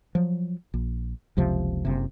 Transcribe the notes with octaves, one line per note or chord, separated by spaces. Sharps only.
F3 F#3
A#1
F#1 C#2 C3 F3
F#1 C3